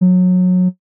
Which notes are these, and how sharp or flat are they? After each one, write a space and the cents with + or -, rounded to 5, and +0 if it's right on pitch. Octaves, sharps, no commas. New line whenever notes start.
F#3 -25